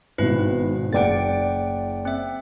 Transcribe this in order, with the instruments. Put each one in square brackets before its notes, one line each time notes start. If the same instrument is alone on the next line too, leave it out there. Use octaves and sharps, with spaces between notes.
[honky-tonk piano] G#1 B2 [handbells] E4 B4
[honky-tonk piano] F#1 D5 D7 [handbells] F#5 G5 A6
[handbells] C4 E5